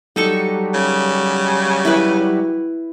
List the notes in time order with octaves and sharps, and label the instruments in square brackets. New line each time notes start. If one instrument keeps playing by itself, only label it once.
[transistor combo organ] F#3 G3 [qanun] D#4 A4 C#6
[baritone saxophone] C#3
[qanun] E4 B4